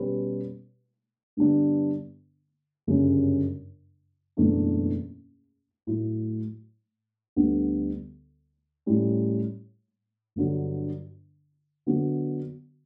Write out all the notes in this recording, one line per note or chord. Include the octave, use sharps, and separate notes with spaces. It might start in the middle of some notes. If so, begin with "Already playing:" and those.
Already playing: B2 G3 C#4 G4 B4
G2 D3 G3 B3 D4
G1 F#2 C#3 G3 C#4
F#1 E2 B2 A3 D4
A2 F#3 A3 E4
D2 D3 G3 B3
A2 G3 C#4
G1 G2 D3 F#3
D3 F#3 B3 F#4